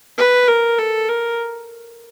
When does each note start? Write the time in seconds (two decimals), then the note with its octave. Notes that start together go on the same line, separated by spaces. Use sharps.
0.18 B4
0.48 A#4
0.78 A4
1.09 A#4